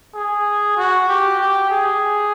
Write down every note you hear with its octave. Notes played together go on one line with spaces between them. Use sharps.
G#4
F#4
G4
G4
G#4